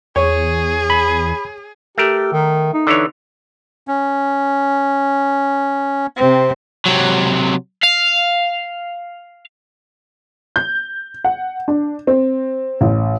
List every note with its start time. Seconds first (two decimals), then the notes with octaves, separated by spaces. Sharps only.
0.16 E2 G#4 C#5
0.90 B5
1.98 A3 G4 A#4
2.32 D#3
2.74 D#4
2.87 D3 E3 C#5
3.88 C#4
6.17 C3 C4
6.86 C3 F#3
7.84 F5
10.56 G6
11.24 F#5
11.68 D4
12.07 C4
12.81 A1